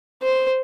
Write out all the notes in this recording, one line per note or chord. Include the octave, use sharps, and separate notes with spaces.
C5